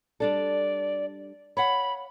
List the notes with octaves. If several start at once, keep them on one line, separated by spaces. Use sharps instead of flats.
G3 D4 A4 D5
C#5 F5 F#5 B5